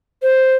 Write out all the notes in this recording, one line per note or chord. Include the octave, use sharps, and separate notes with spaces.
C5